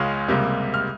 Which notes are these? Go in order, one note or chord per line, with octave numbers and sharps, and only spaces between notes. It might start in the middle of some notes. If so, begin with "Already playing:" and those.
Already playing: C#2 C#3 G#3 C#4 F4
C#2 C3 G3 A#3
F6